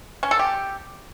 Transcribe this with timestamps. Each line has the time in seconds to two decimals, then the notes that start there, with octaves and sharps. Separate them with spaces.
0.23 C#4
0.31 A4
0.39 G4